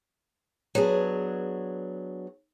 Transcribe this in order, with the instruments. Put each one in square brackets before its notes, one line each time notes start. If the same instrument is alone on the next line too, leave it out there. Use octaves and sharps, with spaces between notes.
[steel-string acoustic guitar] F#3 B3 D4 G#4